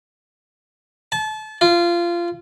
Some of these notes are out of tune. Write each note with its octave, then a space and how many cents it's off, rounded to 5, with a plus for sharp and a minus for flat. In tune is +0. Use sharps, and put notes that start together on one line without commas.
A5 -30
F4 -20